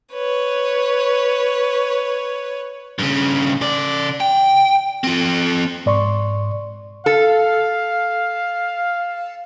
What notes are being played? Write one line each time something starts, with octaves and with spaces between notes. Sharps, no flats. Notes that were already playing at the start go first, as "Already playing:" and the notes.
B4 C#5
G2 C#3
C#3 D5
G5
C4 F4
G#2 D5 C6 C#6
A4 F5